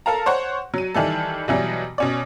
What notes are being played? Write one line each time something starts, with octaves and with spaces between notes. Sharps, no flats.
A4 A#4 F5 A5 A#5
C5 C#5 F#5 C#6
F#3 D#7
D#3 E3 G3 A4
B2 E3 F#3 G3
B2 C#4 D5